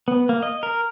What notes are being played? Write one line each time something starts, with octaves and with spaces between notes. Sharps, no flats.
B3
A#3
D#5
A#4